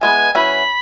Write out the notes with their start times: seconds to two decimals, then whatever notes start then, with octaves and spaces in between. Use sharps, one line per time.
0.01 E3 G#3 B3 G#5
0.35 F#3 C#4 E4 B4 B5